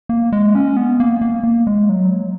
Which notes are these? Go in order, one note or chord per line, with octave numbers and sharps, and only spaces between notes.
A#3
G#3
C#4
B3
A#3
A#3
A#3
G#3
F#3